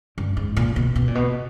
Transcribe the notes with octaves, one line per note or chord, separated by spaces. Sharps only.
G2
G#2
A#2
B2
B2
A#2
B2